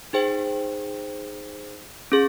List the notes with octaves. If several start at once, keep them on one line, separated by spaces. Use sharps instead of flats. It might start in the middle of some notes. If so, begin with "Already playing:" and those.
D#4 G#4 C5 G5
C#4 G#4